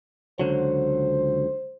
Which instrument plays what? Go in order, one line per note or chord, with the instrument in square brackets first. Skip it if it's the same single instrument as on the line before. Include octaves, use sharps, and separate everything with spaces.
[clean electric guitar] C#2 D3 F#3 [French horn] C5